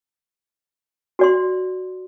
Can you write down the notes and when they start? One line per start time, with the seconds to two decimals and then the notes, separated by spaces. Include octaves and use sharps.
1.19 F#4 D5 C6